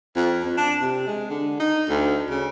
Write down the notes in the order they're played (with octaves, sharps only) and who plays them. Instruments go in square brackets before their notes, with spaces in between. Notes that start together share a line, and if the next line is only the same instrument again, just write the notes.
[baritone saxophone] F2
F2
D4
C3
G#3
D3
D#4
D2
C#3